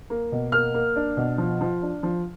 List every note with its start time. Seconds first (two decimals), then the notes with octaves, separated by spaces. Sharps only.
0.10 A#3
0.32 B2
0.52 A#3 F6
0.74 A#3
0.96 D4
1.17 B2
1.38 F3
1.61 F3
1.82 D4
2.03 F3